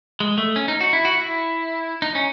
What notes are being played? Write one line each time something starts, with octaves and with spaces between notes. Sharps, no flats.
G#3
A3
C#4
D#4
F#4
E4
F#4
E4
D#4
C#4